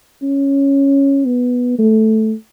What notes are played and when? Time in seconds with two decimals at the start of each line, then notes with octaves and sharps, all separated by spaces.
0.23 C#4
1.26 B3
1.78 A3